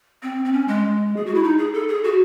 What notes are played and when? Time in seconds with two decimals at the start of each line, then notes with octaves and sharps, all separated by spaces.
0.23 C4
0.45 C4
0.53 C#4
0.68 G#3
1.16 G#4
1.26 F#4
1.35 E4
1.43 D#4
1.58 G#4
1.74 A4
1.88 G#4
2.04 F#4